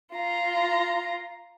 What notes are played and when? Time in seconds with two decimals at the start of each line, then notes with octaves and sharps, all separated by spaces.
0.13 F4 A#5